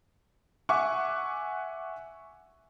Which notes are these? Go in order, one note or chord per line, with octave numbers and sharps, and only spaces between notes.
E5 F#5 G#5 C#6 D6